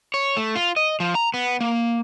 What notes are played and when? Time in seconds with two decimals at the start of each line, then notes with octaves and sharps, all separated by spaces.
0.14 C#5
0.37 A3
0.56 F4
0.76 D#5
1.00 F3
1.15 A#5
1.34 B3
1.61 A#3